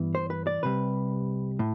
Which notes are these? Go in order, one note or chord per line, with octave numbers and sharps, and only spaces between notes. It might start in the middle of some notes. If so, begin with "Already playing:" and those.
Already playing: G2 E3 B3
C5
B4
D5
C2 C3 G3 B4
A2